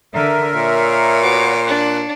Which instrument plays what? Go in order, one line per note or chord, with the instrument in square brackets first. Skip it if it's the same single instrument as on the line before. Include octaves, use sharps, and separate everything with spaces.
[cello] D3 [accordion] A#4 E5
[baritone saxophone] A#2 [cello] C#5 F5
[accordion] B3 F#4 B4 [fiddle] D6
[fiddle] D4 [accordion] F#6